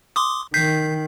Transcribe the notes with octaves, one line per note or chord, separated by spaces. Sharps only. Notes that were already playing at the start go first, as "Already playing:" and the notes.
C6 D6 D#6
D#3 G6 B6 C7